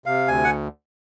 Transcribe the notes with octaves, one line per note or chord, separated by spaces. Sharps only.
C3 F5
D2 G#5
F#5